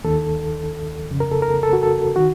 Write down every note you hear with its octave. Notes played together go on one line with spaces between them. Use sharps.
D#2 D#3 A4
F2 C#3
A#4
A4
A#4
A4
F#4
A4
D#3 F#4